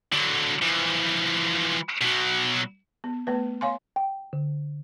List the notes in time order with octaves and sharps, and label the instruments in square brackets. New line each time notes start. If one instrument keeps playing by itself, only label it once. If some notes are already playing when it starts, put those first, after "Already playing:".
[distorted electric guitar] D3 F#3
E3 F3
B2 F#3
[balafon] B3
A3 B3 B4
C#5 F5 G#5 C6
[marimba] G5
D3